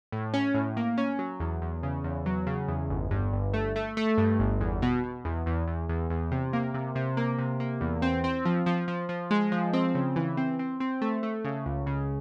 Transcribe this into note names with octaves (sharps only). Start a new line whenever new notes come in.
A2
C#4
A2
A#3
C#4
F#3
E2
E2
C#3
E2
F#3
C#3
E2
G1
G2
G1
A3
A3
A3
G2
G1
E2
B2
B2
E2
E2
E2
E2
E2
C3
A#3
C3
C3
A#3
C3
A#3
E2
C4
C4
F3
F3
F3
F3
G#3
F3
C4
C#3
E3
C4
C4
C4
A3
A3
C#3
C#2
C#3